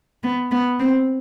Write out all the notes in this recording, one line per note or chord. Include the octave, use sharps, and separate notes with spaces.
B3
B3
C4